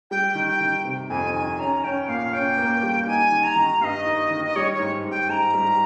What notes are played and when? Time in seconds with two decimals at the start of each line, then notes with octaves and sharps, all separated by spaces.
0.11 G3 G5
0.35 D#3
0.48 G5
0.61 D#3
0.84 C3
1.09 F2 G#5
1.34 D#3 G#5
1.59 C#4 A#5
1.84 C#4 G5
2.08 A#2 F5
2.33 C#4 G5
2.57 A#3
2.83 G3
3.07 D#4 G#5
3.31 D#3
3.44 A#5
3.56 D#3
3.81 G2 D#5 F5
4.06 D#4
4.31 D#3
4.45 D#5
4.56 G3 C#5
4.74 C#5
4.80 G#2
5.04 G#2
5.10 G5
5.29 G#2 A#5
5.54 G3